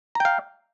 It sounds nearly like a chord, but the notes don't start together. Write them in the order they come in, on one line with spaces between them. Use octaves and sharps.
A#5 G5 F5